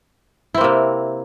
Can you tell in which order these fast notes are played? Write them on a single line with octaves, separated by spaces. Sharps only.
E4 C4 A#3 C3